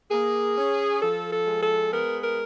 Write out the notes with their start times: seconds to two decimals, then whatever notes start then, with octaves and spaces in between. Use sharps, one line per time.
0.11 A#3 G#4
0.57 C#4
1.02 F3 A4
1.33 A4
1.48 G#3
1.63 A4
1.93 B3 A#4
2.24 A#4